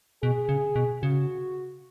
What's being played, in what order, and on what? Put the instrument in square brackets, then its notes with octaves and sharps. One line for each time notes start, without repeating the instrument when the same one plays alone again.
[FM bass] B2 [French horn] G#4
[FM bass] C#3
B2
[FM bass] C#3 [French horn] F#4